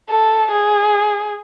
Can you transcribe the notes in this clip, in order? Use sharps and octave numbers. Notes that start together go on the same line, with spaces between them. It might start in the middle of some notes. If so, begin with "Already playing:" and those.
A4
G#4